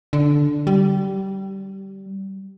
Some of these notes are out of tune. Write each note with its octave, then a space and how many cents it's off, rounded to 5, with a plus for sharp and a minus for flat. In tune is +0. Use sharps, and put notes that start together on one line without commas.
D3 -5
G3 -20